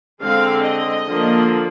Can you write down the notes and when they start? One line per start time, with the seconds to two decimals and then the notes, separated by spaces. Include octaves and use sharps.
0.21 D3 G#3 C4 F5
0.65 D#5
1.07 D3 F3 A#3